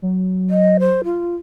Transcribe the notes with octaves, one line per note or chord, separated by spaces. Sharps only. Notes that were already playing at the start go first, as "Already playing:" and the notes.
F#3
D#5
C5
F4